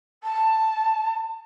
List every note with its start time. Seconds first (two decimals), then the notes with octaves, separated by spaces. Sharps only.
0.23 A5